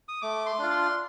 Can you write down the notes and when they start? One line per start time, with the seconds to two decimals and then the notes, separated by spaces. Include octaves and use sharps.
0.08 D#6
0.22 A3 D6
0.46 C6
0.59 D4 F4
0.70 C6